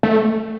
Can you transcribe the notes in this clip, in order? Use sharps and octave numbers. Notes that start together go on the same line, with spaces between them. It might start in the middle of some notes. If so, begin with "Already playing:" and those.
A3